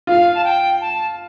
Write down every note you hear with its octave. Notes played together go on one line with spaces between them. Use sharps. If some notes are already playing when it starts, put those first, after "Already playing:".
F4 F5
A5
G5
A5